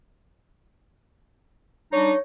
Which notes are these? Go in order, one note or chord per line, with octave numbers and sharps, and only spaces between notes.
G3 D4 D#4 C#5